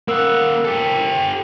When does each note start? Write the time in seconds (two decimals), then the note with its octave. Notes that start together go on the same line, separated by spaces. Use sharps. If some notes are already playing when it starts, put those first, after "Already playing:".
0.08 A#3 A#4 F#5 E6
0.65 G4 A4